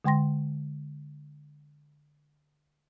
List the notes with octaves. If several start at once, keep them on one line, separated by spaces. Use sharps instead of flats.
D3 G#3 G5 C6 A#6